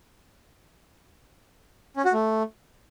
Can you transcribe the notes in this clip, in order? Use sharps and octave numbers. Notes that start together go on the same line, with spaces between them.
C#4
F#4
A3